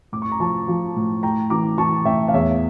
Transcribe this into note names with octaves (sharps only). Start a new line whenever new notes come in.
A2 D6
C#6
A#5
F3 A5 C#6
F3
A2
A2 G5 A#5
E3 A#5 D6
E3 A5 C#6
A2 E5 G5
F5
E2 C#5 E5